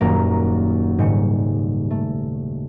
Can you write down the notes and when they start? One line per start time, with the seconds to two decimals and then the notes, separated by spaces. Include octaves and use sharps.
0.01 D#1 F#2 A#3
0.98 D#1 G#2 C#3 G3 G6 C#7
1.91 A3